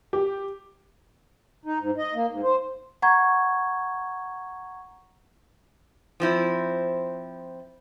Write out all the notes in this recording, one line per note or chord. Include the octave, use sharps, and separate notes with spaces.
G4
D#4
G#2
D#5
A#3
G#2
C5
F#5 A#5 C#6 G#6
F3 C4 E4